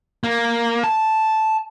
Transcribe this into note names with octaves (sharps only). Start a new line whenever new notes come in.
A#3
A5